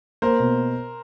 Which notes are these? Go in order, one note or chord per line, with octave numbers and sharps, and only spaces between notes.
A#3 A#4 C5
B2